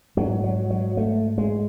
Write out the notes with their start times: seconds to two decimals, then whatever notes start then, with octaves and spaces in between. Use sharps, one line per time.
0.17 G#2 F#3
0.44 F#3
0.70 F#3
0.97 A3
1.38 G#3